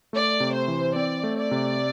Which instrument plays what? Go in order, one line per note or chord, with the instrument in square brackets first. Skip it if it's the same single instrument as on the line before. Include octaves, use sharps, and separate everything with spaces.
[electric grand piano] A3 [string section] D5
[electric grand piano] C3
[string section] C5
[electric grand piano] E3
[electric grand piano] C4 [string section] D5
[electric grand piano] A3
[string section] D5
[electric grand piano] C3